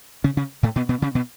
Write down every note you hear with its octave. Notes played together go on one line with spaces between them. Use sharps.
C#3 C#4
C#3 C#4
A2 A3
B2 B3
B2 B3
C#3 C#4
B2 B3